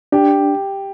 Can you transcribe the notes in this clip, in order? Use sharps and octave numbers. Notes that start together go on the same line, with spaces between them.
D4 G4